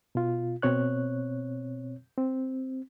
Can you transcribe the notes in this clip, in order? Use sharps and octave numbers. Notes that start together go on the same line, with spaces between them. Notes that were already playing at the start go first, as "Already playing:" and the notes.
B2 F4
B2 C4 C#5 F#6
C4